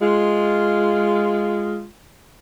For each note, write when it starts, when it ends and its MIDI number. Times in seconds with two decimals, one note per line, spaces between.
0.01 1.86 56
0.01 1.86 65